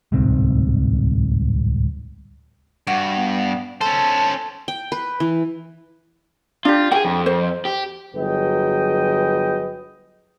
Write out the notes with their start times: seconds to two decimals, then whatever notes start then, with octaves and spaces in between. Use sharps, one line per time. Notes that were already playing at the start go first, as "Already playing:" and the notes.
0.12 D1 C2 G#2 C4
2.87 G2 F#4
3.17 B3
3.81 C#4 A4 C5 A5
4.68 G5
4.92 B4
5.20 E3
6.65 D4 F4 G4
6.92 F#4 G#4 G5
7.05 F2
7.26 C5
7.65 G4
8.15 G1 F#3 G#4 B4 D#5 G5